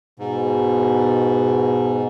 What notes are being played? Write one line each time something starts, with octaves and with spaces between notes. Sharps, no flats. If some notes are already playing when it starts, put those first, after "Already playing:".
G#2 B2